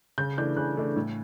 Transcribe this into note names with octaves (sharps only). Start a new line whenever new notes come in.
C#3 G6
E3 A3 D4 G6
C#3 F#6
E3 A3 D4
A2